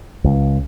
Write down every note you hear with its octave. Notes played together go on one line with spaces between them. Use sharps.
C#2